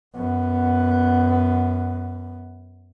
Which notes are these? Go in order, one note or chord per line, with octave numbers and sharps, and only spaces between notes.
F#2 B3